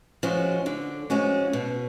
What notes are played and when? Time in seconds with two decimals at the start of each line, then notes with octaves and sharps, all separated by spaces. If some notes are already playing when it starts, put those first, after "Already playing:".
0.23 F3 G#3 C#4 F#4
0.66 D3
1.10 F3 G#3 C#4 F#4
1.53 B2